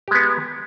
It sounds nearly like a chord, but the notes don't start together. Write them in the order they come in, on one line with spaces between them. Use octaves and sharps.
G4 G#3 B3